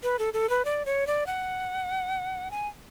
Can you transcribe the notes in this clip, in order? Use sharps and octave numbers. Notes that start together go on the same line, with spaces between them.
B4
A4
A4
B4
D5
C#5
D5
F#5
G#5